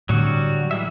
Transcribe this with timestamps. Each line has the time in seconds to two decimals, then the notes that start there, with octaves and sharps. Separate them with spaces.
0.09 A2 D3 F#3 G3 F#4
0.71 E3 G#3 E5